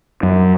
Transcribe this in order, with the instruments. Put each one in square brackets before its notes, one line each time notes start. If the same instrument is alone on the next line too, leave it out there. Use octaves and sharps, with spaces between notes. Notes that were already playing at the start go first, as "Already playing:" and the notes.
[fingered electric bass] F#2